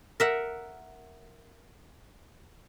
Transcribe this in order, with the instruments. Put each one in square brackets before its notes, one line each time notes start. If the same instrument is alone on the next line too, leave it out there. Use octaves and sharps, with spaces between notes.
[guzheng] A#4 E5 F#5